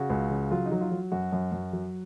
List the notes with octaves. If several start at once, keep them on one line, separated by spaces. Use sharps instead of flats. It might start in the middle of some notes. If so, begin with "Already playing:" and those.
Already playing: C#3 F#4
C#2
C#3
F#3 F4
D#4
F#3
F4
F#3
F#2 F#4
F#2
F#2
F#3